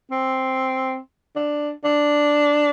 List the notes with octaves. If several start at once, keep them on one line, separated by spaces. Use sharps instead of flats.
C4
D4
D4